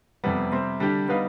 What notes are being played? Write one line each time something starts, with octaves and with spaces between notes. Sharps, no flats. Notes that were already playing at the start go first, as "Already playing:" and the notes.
F2 C3 G3 B3
C3 G3 C4
D3 G3 D4 G4
G3 B3 D#4 B4 F5